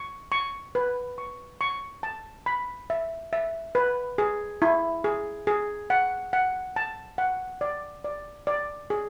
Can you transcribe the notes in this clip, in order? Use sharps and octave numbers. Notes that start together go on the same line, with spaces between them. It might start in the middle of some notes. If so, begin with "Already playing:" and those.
Already playing: C#6
C#6
B4
C#6
C#6
A5
B5
E5
E5
B4
G#4
E4
G#4
G#4
F#5
F#5
A5
F#5
D5
D5
D5
G#4